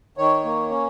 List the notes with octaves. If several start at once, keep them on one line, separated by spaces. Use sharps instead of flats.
D#3 C#5
A#3
C#4